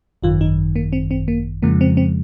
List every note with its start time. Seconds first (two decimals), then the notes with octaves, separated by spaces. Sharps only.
0.23 G#1 F#2 D#3 F4
0.41 D#4
0.76 A#3
0.93 C4
1.11 C4
1.28 A#3
1.62 F2 C#3 F3 G#3 A#3
1.81 C4
1.97 C4